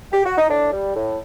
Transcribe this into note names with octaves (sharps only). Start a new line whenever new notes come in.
G4
F#4
D#4
A2 D4
G3
A2